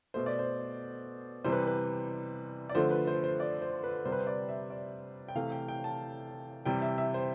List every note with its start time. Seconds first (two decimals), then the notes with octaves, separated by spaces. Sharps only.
0.14 B2 A3 C5
0.26 D5
0.39 C5
1.44 C3 E3 G3 C5
1.52 B4
1.67 B4
2.69 D5
2.75 D3 F3 A3 C5
2.91 B4
3.07 C5
3.24 C5
3.40 D5
3.62 C5
3.84 B4
4.05 C3 G3 C5
4.12 B4
4.19 C5
4.27 D5
4.49 E5
4.70 D5
5.28 G5
5.35 C3 E3 A3 F5
5.52 G5
5.68 G5
5.84 A5
6.65 C3 E3 G3 G5
6.82 E5
6.98 E5
7.14 C5